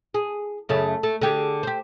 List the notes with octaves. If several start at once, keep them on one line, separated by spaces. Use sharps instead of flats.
G#4
F#2 C#3 A3
A3
D3 G4 G#4
G4 C5